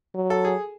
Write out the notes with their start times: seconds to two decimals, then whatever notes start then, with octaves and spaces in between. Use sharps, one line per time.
0.15 F#3
0.30 A4
0.45 G#4